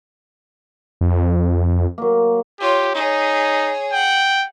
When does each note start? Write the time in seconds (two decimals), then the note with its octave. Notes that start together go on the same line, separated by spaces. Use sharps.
1.01 F2
1.98 F#3 A#3
2.60 F4 G4 C#5
2.95 D#4 G#4 C#5
3.93 F#5 G5